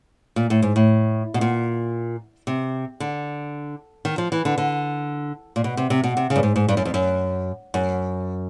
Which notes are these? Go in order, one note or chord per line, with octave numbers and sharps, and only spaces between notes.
A#2
A2
G#2
A2
B2
A#2
C3
D3
D#3
F3
E3
D3
D3
A#2
B2
C3
C3
B2
C3
C#3
G2
G#2
G#2
G2
F#2
F2
F#2
F#2